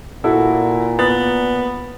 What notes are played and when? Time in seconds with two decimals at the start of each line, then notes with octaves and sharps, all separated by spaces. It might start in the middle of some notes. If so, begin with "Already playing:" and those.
0.24 A#2 E4 F#4 A4
0.99 B3 A6